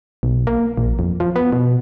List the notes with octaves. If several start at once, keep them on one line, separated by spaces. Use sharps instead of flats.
B1
A#3
A#1
F2
F3
B3
B2